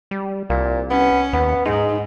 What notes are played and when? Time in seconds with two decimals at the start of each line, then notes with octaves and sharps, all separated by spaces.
0.11 G3
0.49 C2 A#2
0.90 B3 C#4
1.33 D#2 B3
1.65 G#2 G#3 D#4